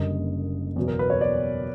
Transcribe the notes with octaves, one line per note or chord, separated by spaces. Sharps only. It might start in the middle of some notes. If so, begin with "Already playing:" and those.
Already playing: F#1 F#2 D3 G3 A#3 D#5
E2 B2 F#3
A#4
B4
C#5
D5